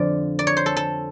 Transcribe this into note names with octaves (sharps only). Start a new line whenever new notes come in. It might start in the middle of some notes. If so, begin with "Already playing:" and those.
Already playing: F2 D3 F3 D5
D5
C#5
C5
A4
A4